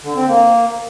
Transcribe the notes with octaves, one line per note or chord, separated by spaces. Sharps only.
D3
C4
A#3